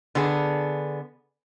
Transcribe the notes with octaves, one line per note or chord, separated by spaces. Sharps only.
D3 B3 G#4